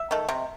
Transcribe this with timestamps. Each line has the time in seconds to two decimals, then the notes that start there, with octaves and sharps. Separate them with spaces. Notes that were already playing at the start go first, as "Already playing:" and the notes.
Already playing: E5
0.11 D#3 A3
0.29 C3